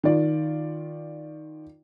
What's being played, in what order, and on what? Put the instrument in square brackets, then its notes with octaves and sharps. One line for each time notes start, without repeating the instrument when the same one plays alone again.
[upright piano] D#3 F4 D5